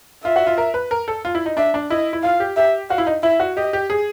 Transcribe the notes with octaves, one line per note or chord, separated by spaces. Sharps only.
F4 E5
F#4
F4
A#4
B4
A#4
A4
F4
E4
D#4
D4 E5
D4
E4 D#5
E4
F4 F5
G4
G4 E5
F#4 F5
E4
D#4
E4 E5
F#4
G4 D#5
G4
G#4